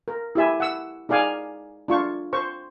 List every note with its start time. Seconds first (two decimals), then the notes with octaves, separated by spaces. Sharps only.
0.08 A#4
0.35 E4 G4 E5 G#5
0.60 F#5 E6
1.09 D#4 G#4 D5 F5 G#5
1.88 D4 F4 C#6
2.33 C5 C#6